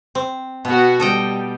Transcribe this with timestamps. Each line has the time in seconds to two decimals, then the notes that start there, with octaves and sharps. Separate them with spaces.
0.15 C4
0.65 B2 B3 F#4
1.00 G3 A4 D#5 G5